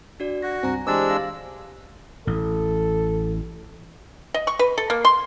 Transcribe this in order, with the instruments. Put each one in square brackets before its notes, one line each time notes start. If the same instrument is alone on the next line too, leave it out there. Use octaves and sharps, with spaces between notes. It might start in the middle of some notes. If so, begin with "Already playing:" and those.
[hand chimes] D4 F#4 D5
[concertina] F#4 [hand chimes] A#6
[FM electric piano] C#2 G2 C4 [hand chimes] G#5 A#5
[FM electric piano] E3 G4 C5 [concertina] G#3 D4 E6 [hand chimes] D6 A6
[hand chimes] F5 A#6
[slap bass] A1 [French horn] A4
[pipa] D#5
C#6
B4
A4
A#3
C6